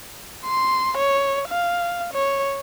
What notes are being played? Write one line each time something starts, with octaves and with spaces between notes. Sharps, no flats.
C6
C#5
F5
C#5